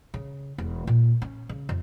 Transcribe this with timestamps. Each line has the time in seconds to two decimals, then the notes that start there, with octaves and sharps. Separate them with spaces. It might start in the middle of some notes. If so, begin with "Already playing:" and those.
0.14 C#3
0.58 E1
0.87 A#2
1.22 C#4
1.49 C#3
1.69 F2